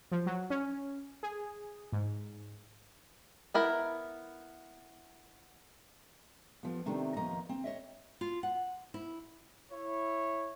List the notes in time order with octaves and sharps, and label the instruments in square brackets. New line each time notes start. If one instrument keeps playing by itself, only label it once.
[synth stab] F3
F#3
C#4
G#4
G#2
[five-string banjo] B3 E4 A#4
[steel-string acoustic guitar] F2 F3 B3
C3 D#3 A3 B3 C4 D4
D#2 F3 B3 D#5 A#5
C4
C#5 D#5 E5
[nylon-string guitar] F4
F#5
E4
[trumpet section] E4 C#5